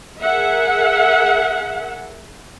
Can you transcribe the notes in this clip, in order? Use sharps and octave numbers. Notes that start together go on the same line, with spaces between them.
G#4 A#4 E5 F#5